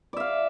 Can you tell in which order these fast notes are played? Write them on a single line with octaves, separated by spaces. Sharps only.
D5 E5 F5